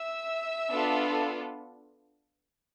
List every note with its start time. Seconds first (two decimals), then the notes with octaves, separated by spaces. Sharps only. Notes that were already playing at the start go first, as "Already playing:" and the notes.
Already playing: E5 E6
0.70 B3 D4 F4 A4